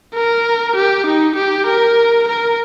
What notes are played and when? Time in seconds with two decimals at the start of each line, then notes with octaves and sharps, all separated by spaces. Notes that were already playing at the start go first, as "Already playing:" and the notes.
0.14 A#4
0.76 G4
1.06 D#4
1.36 G4
1.67 A#4
2.29 A#4